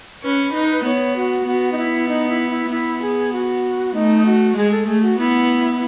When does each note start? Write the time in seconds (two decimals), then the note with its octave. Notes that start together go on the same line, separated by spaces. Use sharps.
0.23 C#4 B4
0.54 D#4
0.85 B3 C#5
1.16 F#4
1.46 B3 F#4
1.72 D#4
1.78 E4
2.08 D#4
2.29 E4
2.50 E4
2.70 B3 E4
3.02 G#4
3.33 F#4
3.94 A3 D#4
4.26 F#4
4.57 G#3 G#4
4.71 A4
4.87 A3 G#4
5.02 F#4
5.18 B3 E4